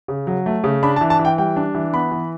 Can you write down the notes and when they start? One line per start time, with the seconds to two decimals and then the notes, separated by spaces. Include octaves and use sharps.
0.08 C#3
0.27 F#3
0.46 A3
0.64 C#3
0.83 D4 B5
0.96 A5
1.01 E3
1.10 A5
1.19 E3
1.25 G5
1.38 G3 G5
1.56 D4
1.75 E3
1.93 B3 B5
2.12 E3